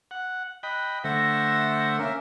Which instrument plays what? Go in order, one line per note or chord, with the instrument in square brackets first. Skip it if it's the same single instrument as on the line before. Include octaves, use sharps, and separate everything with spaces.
[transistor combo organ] F#5
[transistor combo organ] D#5 G5 B5 [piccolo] F#6
[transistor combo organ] D3 A3 [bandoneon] C5 E5 F#5 [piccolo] A#6
[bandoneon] A#3 C#4 A#4 [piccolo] E5